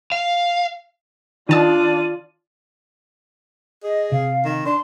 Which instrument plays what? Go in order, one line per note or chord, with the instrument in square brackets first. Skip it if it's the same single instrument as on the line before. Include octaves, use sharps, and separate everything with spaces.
[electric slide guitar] F5
[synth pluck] D#3 A5 D#6 [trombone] D4 [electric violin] F4 D5 [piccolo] D#7
[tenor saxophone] G#4 [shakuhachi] D#5
[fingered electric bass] C3 [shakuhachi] F5
[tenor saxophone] D#3
[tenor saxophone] D4 [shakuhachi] C6